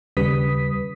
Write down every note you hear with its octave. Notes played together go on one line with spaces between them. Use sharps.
D#2 C#3 G3 B4 D#6 B6